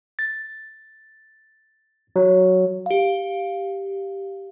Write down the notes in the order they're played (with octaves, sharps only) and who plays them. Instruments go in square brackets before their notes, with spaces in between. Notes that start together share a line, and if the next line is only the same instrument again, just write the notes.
[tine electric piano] A6
F#3
[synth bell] G4 F5